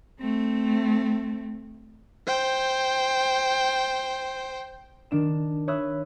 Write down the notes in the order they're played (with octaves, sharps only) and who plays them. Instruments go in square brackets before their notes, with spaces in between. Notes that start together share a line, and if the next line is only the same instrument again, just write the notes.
[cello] A3 C4
[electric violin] C5 G5
[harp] D#3 D4 E7
C#5 E5 B5 D#6 E6 F#6